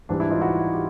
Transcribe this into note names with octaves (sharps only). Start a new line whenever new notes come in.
G#2 E3 G3 D4
D4 E4
D#4 F4
E4 F#4
F4 G4